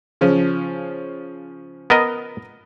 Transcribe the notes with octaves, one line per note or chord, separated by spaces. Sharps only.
C#3 F3 C#4
B3 A#4 D#5